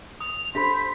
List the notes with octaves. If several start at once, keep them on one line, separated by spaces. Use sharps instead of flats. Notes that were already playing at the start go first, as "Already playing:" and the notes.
D#6 F7
D4 G4 A4 C5 E5 B5 B6